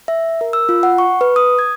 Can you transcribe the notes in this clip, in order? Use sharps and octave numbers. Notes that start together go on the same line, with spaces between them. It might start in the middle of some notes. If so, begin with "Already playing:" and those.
E5
A#4
E6
F4
F#5
C#6
B4
D#6
G#6